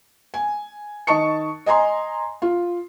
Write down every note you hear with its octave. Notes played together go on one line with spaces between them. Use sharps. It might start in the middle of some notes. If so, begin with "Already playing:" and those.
G#5
D#3 D#5 A5 C#6 C#7
D#5 G#5 A#5 C6
F4